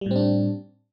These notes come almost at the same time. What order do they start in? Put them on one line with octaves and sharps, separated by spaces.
G3 A2 C4 D4